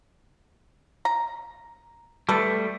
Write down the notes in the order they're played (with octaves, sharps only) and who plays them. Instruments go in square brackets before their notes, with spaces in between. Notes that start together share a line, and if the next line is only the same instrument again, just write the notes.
[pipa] A#5
[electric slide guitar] G3 A3 [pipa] A4 B4